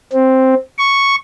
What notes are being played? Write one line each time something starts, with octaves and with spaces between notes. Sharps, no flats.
C4
C#6